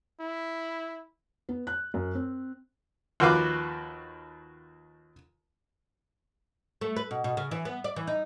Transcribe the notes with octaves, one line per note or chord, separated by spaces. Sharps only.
E4
B3
F#6
F#2
C4
D#2 F3 F#4 B4 F5 D6
A3
B4
B2
B2
C#3
E3
B3
D5
E3
D#4